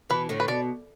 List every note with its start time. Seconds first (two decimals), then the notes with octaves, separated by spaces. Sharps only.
0.10 B2 E3 B4
0.29 A2 D3
0.40 B4
0.48 B2 D5